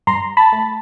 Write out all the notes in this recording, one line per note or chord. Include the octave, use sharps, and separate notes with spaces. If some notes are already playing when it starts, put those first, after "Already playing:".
G2 A#5 C6
A5 B5
A3